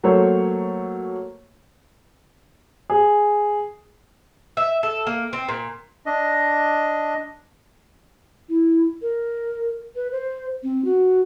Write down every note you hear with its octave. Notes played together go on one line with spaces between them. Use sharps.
F#3 A3 A#3 C5 C#5
G#4
E5
A4
A#3
C4
A#2
D4 D#5
E4
A#4
B4
C5
C4
F#4